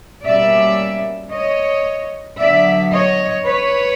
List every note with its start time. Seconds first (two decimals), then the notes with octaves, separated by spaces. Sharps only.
0.23 B2 G3 A#3 C#4 D5 E5
1.31 C#5 D#5
2.38 D3 F#3 B3 D5 E5
2.91 C#5 D#5
3.45 B4 C#5